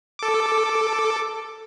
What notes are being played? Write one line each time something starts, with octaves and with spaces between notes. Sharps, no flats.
A4 D6